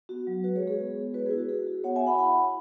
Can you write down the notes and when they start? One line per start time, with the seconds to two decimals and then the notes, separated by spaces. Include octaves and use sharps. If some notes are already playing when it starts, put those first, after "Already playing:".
0.09 B3 F#4
0.27 F#3
0.44 G#3 F#4 B4
0.55 G#4 C#5
0.62 G#3
0.67 G#4 C#5
0.80 B3
0.97 B3
1.14 E4 F#4 B4
1.26 G#4
1.31 E4
1.38 F#4
1.49 F#4 G#4
1.67 F#4
1.84 B3 C#5 F#5
1.96 E5 G#5
2.01 F#4
2.07 F#5 B5
2.18 E4 F#5 B5
2.36 E4